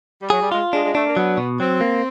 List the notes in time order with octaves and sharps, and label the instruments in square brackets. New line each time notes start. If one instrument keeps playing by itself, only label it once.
[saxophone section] G3
[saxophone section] F#3 [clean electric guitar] G#4
[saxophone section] G3
[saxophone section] G#3 [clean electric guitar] F4
[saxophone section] G#3 [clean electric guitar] D4
[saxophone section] G#3
[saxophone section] A3 [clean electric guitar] D4
[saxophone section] A#3
[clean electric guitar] F#3 [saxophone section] B3
[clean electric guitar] B2
[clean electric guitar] F#3 [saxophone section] C4
[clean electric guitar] A#3